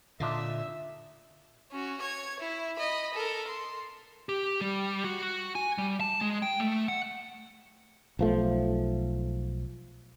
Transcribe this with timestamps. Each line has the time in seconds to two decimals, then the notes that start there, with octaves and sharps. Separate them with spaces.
0.20 A#2 D3 D4 D#4 F4 E5
1.71 C#4 F#4
2.01 C#5 G#6
2.40 E4
2.77 D#5 B5
3.14 A4 A#4
3.47 C6
4.29 G4
4.61 G3
5.04 F#4
5.23 F#4
5.55 G#5
5.78 G3
6.01 A5
6.21 G#3
6.42 G5
6.60 A3
6.88 F#5
8.19 B1 F3 A3